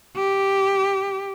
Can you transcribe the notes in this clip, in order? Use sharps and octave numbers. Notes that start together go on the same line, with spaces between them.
G4